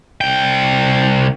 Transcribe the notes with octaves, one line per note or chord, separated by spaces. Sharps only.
C2 G5